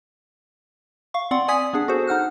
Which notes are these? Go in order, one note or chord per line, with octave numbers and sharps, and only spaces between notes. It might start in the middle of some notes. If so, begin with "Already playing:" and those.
F5 C#6
C4 D5 F#5 C6
D5 G#5 D#6 G#6 B6
B3 D4 G#4 F#5
F#4 G#4 A4 C5
D#4 F#5 F6 F#6